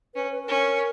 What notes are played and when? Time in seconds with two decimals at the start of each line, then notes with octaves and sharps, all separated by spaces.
0.14 C#4 B4
0.32 B4
0.43 B4
0.48 C#4 A#4